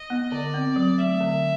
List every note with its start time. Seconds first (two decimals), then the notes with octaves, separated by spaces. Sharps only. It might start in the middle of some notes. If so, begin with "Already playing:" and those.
Already playing: D#5
0.10 B3
0.32 D3 D5
0.54 C4
0.76 F#3
0.98 A3 E5
1.20 D3